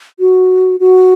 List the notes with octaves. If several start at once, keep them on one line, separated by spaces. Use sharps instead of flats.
F#4
F#4